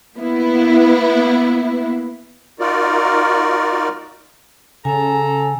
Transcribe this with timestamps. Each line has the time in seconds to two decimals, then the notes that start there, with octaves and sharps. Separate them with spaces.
0.15 A#3 B3 E4
2.60 D#4 F4 F#4 A#4 D5
4.85 C#3 A4 G#5 A#5